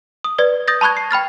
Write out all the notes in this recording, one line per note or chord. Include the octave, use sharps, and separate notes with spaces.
D#6
B4 D5 G#6
D#6 G6 A6 A#6
A5 B5 C#6 F#6 G#6
C7
G5 B5 F6 A6